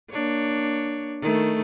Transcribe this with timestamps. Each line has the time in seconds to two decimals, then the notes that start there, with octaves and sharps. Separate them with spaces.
0.11 A#3 D4 C#5
1.22 D#3 A3